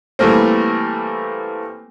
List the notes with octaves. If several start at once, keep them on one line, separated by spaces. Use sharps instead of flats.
E3 G3 A3 A#3 C4